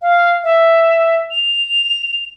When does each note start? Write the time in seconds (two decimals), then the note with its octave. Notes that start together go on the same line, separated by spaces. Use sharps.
0.02 F5
0.44 E5
1.31 F7